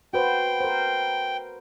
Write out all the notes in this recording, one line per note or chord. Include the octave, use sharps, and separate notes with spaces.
F#4 B4 C5 G5
A#4 C5